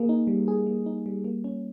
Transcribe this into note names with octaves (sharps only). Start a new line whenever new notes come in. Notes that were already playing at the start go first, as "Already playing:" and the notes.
Already playing: A#3 G#4
D#4
G3
G#4
A#3
D#4
G3
A#3
C#4